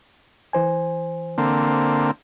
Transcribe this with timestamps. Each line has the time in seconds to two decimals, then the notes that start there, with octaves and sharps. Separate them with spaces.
0.53 E3 C5 G#5
1.38 D3 A#3 C4